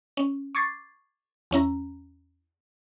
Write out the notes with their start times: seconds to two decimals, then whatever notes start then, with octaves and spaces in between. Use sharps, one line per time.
0.17 C#4
0.55 C#6 D6 G#6 A6 C7
1.51 E2 C#4 E4 A#5